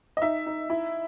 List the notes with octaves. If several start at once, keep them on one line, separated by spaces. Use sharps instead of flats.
D#5
D#4 E5
D#4
E4